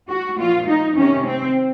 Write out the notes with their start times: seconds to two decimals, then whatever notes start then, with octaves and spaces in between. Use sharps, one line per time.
0.08 F#4
0.37 A#2 F3 F4
0.67 D#4
0.97 C3 D#3 C#4
1.26 C4